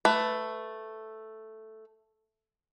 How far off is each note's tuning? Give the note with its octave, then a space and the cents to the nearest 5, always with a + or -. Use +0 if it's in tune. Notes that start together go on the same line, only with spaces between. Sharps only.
A3 +0 B4 +15